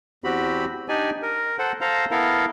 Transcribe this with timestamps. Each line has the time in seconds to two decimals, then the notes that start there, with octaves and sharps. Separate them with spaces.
0.24 E2 C4 F#4 G4 B5
0.88 D4 D#4 G4 D5 G#5
1.22 A#4
1.59 A4 C5 F#5
1.81 A4 C5 F5 A#5
2.11 B3 E4 A4 A#4 F5